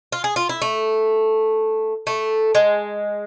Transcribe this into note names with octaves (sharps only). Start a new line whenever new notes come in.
F4
G#4
F4
E4
A3
A3
G#3